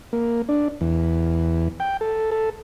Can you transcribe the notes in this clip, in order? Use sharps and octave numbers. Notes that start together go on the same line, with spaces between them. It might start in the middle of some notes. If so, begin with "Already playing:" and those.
A#3
D4
E2
G5
A4
A4